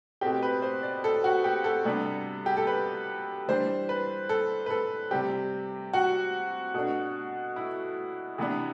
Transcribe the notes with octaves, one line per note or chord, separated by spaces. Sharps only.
B2 A3 C4 G4
B4
C5
D5
A4
F#4
G4
A4
C3 G3 B3 D4
G4
A4
B4
E3 G3 D4 C5
B4
A4
B4
A4
C3 G3 C4 G4
F#4
B2 A3 D4
E4
C3 E3 B3 D4